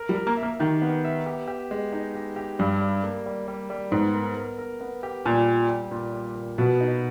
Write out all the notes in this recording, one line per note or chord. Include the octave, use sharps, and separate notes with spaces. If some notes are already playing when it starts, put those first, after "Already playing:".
Already playing: A#4
G3
A#4
A#3
E5
A#3
D#3 G4
B3
E5
G4
G4
G#3
D#4
G4
G4
G2 G3
G3
A#3
G3
G3
G3
G#2 B3
A#4
A#4
A#4
B3
G4
A#2 G3
G3
G3
A#2
G3
A#2
B2 B3
D#4